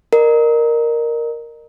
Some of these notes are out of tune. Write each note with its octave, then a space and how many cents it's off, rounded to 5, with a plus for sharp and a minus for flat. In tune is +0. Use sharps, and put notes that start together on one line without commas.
A#4 +0 D#5 -40